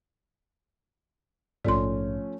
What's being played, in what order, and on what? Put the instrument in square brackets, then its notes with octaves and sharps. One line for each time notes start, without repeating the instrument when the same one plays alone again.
[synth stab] A#1 G#2 [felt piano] F3 A3 C#4 [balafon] D5 C6